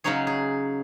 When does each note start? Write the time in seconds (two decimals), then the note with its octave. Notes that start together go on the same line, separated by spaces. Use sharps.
0.04 C#3 F#3 D#4 G#4 C#5
0.27 G#4